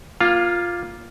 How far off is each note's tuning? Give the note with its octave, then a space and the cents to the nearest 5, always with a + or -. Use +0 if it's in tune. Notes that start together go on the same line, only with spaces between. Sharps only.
A#3 +20 F4 +0 F5 +0